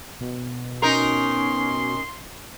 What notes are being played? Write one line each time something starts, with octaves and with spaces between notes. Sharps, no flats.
B2
C#4 D#4 A#4 C6